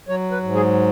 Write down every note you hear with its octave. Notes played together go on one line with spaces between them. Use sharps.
F#3 C#5
B4
G#2
G#4